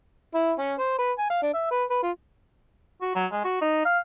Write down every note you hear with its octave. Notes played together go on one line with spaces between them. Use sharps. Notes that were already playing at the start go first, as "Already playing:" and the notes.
E4
C#4
C5
B4
G#5
F5
D4
E5
B4
B4
F4
F#4
F#3
G#3
F#4
D#4
F5